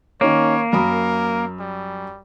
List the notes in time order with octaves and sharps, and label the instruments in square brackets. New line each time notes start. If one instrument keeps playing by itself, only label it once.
[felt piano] D#3 C#4 [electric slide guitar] A#3 [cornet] C#5
[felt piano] F#2 B5 D#6 [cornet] A#4
[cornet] G3